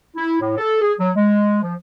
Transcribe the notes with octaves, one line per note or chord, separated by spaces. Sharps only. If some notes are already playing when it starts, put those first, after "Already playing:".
E4
A2
A4
G#4
F#3
G#3
F3